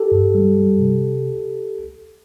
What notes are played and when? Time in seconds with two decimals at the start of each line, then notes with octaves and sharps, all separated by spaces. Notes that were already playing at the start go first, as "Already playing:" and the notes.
Already playing: G4 A4
0.12 G2
0.35 G3
0.56 G3
0.79 C3